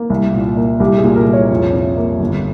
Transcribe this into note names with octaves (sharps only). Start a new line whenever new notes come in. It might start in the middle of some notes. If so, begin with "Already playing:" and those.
Already playing: A#3
C2
A#2
A#3
C2 G4
G#4
A#2
A#4
C2
C#5
F2
C3
A#3
G1